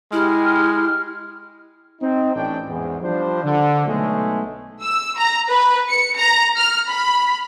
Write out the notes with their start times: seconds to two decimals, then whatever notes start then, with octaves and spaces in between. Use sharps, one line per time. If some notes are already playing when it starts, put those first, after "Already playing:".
0.12 G#3 E4 G4 F6
2.01 C4 D#4
2.35 A1 A2 C#4 D4 G5
2.68 E2 G#2
3.03 F3 G3 D4 C5
3.44 D3
3.86 B1 G#3 A3
4.84 E6
5.16 A#5
5.51 B4
5.89 C#7
6.19 A#5
6.57 F6
6.88 B5